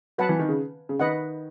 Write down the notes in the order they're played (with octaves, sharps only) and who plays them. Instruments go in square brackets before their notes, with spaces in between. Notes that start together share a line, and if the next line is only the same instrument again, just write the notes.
[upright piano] F#3 [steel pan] B4 F#5 A5
[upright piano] E3
D#3
C#3
C#3
[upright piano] D#3 [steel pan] B4 D#5 F#5